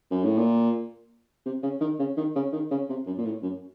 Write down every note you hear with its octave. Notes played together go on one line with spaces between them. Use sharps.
F#2
A2
A#2
C3
C#3
D#3
C#3
D#3
C#3
D#3
C#3
C3
F#2
A#2
A2
F#2